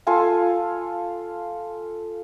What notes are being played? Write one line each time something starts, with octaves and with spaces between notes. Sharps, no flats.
F4 A4 G#5 A5